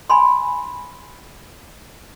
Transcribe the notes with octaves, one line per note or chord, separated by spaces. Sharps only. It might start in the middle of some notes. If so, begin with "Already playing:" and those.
G#5 B5 C6